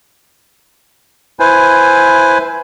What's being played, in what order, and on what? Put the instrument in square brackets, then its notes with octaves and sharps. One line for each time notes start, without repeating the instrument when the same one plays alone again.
[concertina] E4 B4 C5 G#5